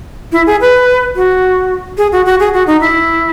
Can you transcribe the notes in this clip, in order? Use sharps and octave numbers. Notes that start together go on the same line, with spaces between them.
E4
G#4
B4
F#4
G#4
F#4
F#4
G#4
F#4
D#4
E4